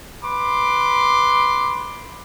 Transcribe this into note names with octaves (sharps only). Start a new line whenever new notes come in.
B4 B5 C6 D6